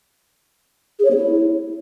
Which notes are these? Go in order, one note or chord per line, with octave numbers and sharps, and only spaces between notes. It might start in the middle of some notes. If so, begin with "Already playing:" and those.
G#4
C#5
B3
E4